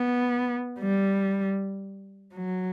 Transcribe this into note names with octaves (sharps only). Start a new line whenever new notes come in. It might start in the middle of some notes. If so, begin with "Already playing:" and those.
Already playing: B3
G3
F#3